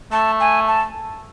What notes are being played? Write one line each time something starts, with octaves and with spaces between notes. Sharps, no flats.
A3 A5
G#5
A5